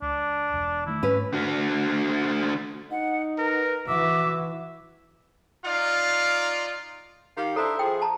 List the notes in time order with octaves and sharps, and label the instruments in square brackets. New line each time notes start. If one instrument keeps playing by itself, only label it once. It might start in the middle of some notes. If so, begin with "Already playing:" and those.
[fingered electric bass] C#2 [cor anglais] D4
[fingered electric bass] E1
[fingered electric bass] D#3 G#3 A3 [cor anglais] E4
[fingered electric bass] G#2 [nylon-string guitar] C#4 B4
[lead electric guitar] D3 F#4
[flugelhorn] D#4 [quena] F#5
[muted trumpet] A#4 [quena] B4
[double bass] E3 [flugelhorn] F#4 [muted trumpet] E5 [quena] D6
[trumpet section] D#4 F4 D5 F5
[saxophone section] D#3 G4 F5
[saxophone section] D4 E4 C5 [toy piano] A4 A#5
[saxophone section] F3 G#4 [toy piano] G5
[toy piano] A5 A#5